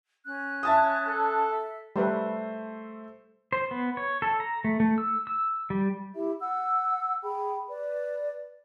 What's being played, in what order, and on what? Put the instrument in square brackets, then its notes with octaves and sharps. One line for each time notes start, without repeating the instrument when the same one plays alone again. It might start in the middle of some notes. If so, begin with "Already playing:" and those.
[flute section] C#4 F#6
[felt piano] E5 A5 D#6
[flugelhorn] A4
[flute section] E5
[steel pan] G3 B4 [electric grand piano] A3 C5 E5
[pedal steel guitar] C5
B3
C#5
A4
A#5
A3
A3
E6
E6
G3
[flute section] E4 G4 E5
F#5 E6
G#4 G5 B5
B4 D5